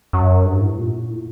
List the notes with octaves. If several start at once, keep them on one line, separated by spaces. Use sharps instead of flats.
F#2
G2
A2
A#2
A2